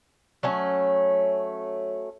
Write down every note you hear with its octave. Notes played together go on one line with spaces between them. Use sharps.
F#3 A3 C#4